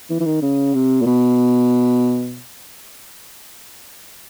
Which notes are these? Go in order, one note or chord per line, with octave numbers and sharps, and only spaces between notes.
E3
E3
D#3
C#3
C3
A#2
B2